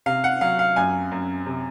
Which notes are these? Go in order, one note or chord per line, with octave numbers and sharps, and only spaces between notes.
C3 F5
F#5
F#3 F5
F5
F#2 G#5
F#2
C3